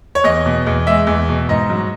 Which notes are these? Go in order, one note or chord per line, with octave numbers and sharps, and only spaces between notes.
C#5
E2 D#5
B2
E2
G#3 E5
E2
B2
G#2 D#5
F#3